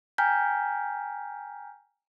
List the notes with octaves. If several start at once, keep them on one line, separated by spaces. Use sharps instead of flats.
G5 G#5 A#5 F6 G6 B6